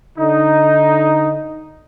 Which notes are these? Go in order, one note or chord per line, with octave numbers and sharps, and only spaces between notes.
D3 D#4